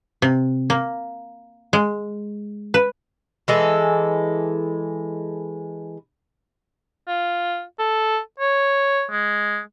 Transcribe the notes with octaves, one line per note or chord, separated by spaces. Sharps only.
C3
A#3
G#3
B4
E3 G#3 A4
F4
A4
C#5
G#3